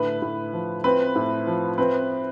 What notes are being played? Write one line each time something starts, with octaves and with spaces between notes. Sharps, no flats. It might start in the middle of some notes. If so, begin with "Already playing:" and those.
Already playing: A2 D3 B4
A2
F3
C4 B4
A2
F3
C4 B4